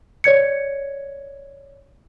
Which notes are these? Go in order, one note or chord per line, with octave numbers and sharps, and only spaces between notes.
C#5 D5 G#6 C#7